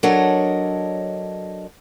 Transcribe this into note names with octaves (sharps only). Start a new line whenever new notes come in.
F#3 D4 A4 A#4 C#5 D#5